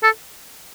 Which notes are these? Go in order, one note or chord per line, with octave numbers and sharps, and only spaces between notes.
A4